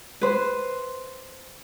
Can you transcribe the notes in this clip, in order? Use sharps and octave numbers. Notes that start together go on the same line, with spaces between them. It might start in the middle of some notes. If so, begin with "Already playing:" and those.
B4 C5